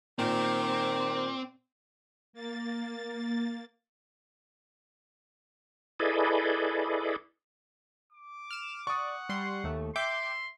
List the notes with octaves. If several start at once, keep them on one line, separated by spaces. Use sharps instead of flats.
A#2 D#3 C4 D6
A#3 A6
E4 G#4 A4 B4 D5 D#5
D6
F6 E7
D5 F#5 C#6 D#6
G3 C6
D#2 A3
E5 G5 C6 D6 G6